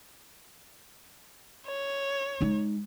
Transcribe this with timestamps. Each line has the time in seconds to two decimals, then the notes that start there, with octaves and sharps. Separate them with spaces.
1.66 C#5
2.41 G#3 D#4